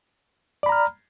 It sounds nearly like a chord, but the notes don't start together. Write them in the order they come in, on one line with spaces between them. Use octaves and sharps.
D5 B5 A#5 F6